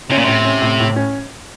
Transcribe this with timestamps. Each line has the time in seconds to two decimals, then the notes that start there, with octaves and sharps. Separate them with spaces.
0.10 C3 C#4
0.18 A#2
0.25 A2 C3
0.44 C#4
0.62 A2
0.80 A2
0.96 C#4